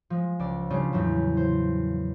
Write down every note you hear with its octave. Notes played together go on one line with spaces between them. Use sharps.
F3 G#3
C#2 D5
C#3 G3 C#4 D4 F4 G#4
E2 A2 C#3 F#3
C5